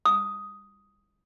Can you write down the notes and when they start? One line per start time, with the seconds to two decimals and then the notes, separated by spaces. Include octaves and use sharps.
0.05 D#6